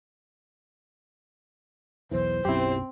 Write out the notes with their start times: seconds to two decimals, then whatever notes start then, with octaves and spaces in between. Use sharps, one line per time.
2.11 B1 E2 E3 C5
2.45 B1 F#2 C4 E4 G4